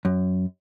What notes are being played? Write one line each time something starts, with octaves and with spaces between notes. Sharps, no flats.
F#2